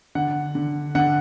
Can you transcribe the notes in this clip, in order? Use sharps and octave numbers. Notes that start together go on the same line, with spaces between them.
D3 F#5
D3
D3 F#5